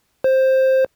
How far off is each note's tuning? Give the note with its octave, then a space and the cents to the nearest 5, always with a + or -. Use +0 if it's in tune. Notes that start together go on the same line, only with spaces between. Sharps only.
C5 +10